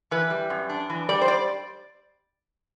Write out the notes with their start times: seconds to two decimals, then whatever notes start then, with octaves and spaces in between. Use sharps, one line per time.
0.11 E3 B4
0.30 G3
0.50 F#2
0.69 D4
0.90 E3
1.09 G3 D5
1.21 C5
1.28 D5